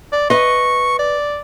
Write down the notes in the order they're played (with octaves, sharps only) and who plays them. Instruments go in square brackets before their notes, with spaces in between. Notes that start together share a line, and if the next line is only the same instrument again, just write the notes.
[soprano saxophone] D5
[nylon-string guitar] B4 D#5 [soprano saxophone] C#6
[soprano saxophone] D5